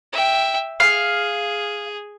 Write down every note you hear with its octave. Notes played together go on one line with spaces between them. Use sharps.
E5 G5
G#4 F5